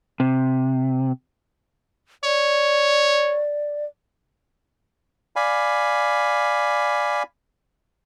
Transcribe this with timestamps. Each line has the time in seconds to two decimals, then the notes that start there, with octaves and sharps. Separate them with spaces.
0.20 C3
2.24 C#5 D5
5.36 D5 F5 G#5 B5